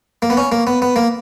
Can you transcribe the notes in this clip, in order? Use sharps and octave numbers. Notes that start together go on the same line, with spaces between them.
A#3
B3
C#4
A#3
B3
B3
A#3